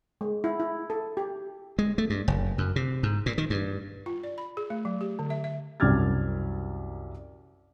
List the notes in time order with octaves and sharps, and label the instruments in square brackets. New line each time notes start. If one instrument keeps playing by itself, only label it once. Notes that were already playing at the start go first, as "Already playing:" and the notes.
[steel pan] G#3
E4
E4
A4
G4
[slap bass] G#3
A3
G2
F#1
F#2
C3
G#2
A#2
D#3
G2
[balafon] F4
D5
B5
G#4
A3
F#3
G4
D3
E5
E5
[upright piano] C2 F#2 D6 F6 G#6 A6